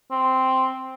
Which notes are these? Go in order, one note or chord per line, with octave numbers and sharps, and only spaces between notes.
C4